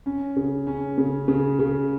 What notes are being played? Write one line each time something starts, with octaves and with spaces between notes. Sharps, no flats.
C#4
C#3
C#4
C#3
C#3
C#3